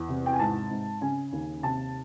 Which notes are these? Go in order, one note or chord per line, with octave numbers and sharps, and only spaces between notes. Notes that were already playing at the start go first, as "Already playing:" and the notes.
Already playing: E2
C3
G5
G#5
G#2 A5
G#2
C#3 G#5
D#2
C3 A5